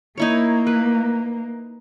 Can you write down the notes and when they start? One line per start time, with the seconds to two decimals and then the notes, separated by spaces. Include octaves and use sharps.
0.17 A#3 D#4 E4 C#5
0.67 B4